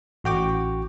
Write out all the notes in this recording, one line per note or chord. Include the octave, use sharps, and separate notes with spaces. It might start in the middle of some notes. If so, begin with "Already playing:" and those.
A1 F#4 G5 D6